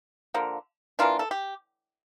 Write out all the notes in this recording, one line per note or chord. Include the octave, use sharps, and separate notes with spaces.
D3 F3 A#3
E3 A#3 D4 F4
A4
G4